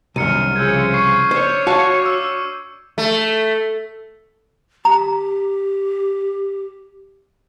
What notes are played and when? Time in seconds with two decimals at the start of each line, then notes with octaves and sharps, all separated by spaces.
0.16 C2 F#2 B2 D#3 F6 C#7 D#7
0.56 C#3 F3 G#3 E6 G6 G#6
0.94 C#6 C7
1.31 D4 C5 C#5
1.67 F#4 F5 A5 C#6
2.02 D6 E6
2.98 A3
4.85 G4 A#5